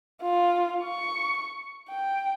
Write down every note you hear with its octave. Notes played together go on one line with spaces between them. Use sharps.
F4
C#6
G5